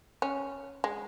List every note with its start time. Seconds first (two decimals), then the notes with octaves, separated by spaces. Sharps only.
0.22 C#4
0.84 G#3